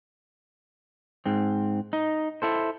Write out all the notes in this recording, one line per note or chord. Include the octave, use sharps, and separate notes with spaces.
G#2 C4
D#4
E4 A4 C5